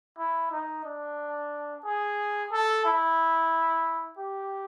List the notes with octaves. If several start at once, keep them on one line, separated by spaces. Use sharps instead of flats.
E4
D#4
D4
G#4
A4
E4
G4